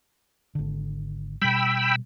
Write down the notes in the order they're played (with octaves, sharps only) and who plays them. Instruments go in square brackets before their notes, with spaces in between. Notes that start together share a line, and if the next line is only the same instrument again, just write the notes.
[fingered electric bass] G#1 D3
[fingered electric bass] B2 G3 [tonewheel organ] G5 B5 E6